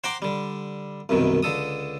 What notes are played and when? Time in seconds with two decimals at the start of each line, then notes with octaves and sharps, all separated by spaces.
0.04 C5 F#5 G5 A#5 C6 D6
0.22 D3 G3
1.09 C2 F#2 B2 D#3
1.43 C#2 D3 A4 D#6